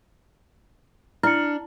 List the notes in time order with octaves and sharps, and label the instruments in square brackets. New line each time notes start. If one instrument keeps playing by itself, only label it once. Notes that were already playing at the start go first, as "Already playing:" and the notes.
[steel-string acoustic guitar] D4 [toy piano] E4 [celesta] F6 C#7